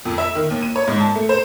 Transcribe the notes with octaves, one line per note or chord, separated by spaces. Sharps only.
F2
E5
D#3
D#2
D#7
C#5
G#2
A5
A3
C5